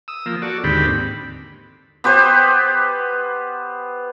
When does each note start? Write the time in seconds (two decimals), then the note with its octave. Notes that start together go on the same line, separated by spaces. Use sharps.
0.08 D#6 E6
0.26 F3 A#3
0.42 F#4 A4 D5
0.64 D#2 G#2 D3 C4 G4 B5
2.04 B3 G4 B4 C5